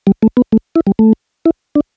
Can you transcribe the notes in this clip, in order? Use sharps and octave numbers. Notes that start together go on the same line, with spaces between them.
G3
A3
B3
A3
E4
G3
A3
E4
D4